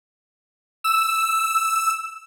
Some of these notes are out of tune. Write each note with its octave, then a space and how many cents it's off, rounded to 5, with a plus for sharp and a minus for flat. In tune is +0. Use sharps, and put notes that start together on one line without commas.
E6 +0